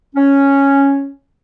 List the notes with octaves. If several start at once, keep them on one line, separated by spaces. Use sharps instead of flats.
C#4